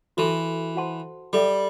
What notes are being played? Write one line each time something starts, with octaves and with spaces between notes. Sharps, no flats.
E3 F#4 A4 E5 A5 C6
F#4 C5 F#5 A5 C6
G3 A4 E5 B5